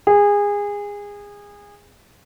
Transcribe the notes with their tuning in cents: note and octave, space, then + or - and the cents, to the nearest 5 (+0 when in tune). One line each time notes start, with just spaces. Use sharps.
G#4 -25